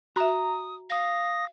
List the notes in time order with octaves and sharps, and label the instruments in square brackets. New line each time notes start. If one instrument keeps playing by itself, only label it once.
[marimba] F#4 E5 [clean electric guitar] A#5 [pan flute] D#6
[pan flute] F5 [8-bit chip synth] D#6 A#6